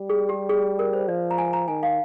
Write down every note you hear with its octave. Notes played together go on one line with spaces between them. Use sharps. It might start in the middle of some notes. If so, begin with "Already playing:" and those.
Already playing: G3
G#4
G4
G#4
A#4
C5
F3 D5
A#5
G#5
A#5
D#3 G#5
F5